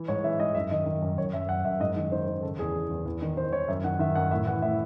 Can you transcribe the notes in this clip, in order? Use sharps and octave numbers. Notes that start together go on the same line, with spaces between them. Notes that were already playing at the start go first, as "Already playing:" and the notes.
Already playing: E3
G#2 C#5
E3 E5
G#2 D#5
F#2 E5
D#3 D#5
D#3
F#2
F#2 C#5
F#2 E5
F#2 F#5
F#2 E5
G#2 D#5
D#3
D#3 C5
D#3 C5
C#3 A4
E2 G#4
E3
E2
E2
D#3
D#3 C5
D#3 C#5
F#2 E5
D#3 F#5
D#3 E5
F#2 F#5
A2 E5
E3 F#5
A2 E5